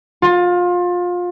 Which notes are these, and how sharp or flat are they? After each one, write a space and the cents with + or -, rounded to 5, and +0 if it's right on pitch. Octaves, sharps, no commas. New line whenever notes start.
F4 +25